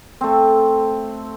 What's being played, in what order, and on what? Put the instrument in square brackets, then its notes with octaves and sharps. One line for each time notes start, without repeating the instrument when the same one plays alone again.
[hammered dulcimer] A3 C4